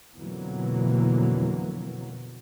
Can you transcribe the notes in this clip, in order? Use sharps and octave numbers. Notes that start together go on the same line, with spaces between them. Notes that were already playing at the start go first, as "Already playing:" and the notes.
F2 B2 D3 E3 F#3 A#3